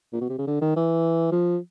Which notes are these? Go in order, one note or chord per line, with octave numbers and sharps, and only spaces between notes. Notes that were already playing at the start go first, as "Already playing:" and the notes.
A#2
B2
C3
C#3
D3
D#3
E3
F3